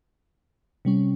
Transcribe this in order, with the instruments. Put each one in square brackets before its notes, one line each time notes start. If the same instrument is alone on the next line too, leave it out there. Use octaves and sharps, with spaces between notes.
[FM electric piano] C3 G3 C#4